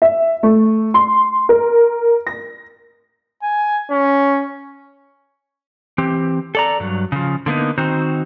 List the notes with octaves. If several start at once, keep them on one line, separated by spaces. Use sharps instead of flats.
E5
A3
C6
A#4
A#6
G#5
C#4
E3 C4 G4
A4 D5 A#5
G2 F#3
C#3 F3
D3 A#3 B3 D#4
D#3 C4 D#4 F#4 C5